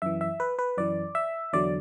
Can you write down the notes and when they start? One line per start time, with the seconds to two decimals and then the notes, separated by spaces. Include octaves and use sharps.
0.02 F#2 E3 E5
0.21 E5
0.40 B4
0.59 B4
0.77 F#2 E3 D5
1.15 E5
1.53 E2 D3 F#3 D5